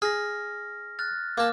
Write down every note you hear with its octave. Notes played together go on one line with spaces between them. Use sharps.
G#4 F6 A#6
F6 F#6 A6
A#3 A5 D6 F6